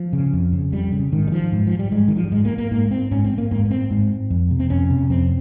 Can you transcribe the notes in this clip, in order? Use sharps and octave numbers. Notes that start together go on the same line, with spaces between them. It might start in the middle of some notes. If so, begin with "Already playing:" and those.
Already playing: F3
C#3
F2
C#3
F2 G3
C#3
G#2 D#3
G3
F3
G#2
F3
G3
G#2 G#3
D#3
F3
G3
G#2 G#3
A#3
A#3
G#2 A#3
C4
G#2 C#4
C4
A#3
G#2 A#3
A#3
C4
G#2
F2
C3
C4
F2 C#4
C3
F2 C4